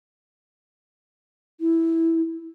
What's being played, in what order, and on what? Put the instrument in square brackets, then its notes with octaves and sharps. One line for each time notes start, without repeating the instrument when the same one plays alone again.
[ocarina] E4